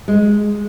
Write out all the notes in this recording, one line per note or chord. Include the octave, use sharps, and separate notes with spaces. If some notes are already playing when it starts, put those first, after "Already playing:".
G#3